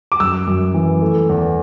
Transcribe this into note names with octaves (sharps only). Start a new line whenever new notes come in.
D6
F#2 E6
F#2
E3
A3
E2